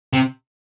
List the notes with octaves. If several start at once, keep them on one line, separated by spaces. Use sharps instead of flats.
C3